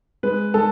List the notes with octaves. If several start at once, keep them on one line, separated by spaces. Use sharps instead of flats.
G#3 B4
G#3 A4